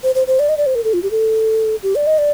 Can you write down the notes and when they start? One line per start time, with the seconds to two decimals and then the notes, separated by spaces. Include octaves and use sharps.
0.03 C5
0.15 C5
0.27 C5
0.39 D5
0.49 D#5
0.57 D5
0.66 C5
0.75 A#4
0.84 A4
0.93 F4
1.03 G4
1.11 A4
1.83 G4
1.95 D5
2.07 D#5
2.18 D5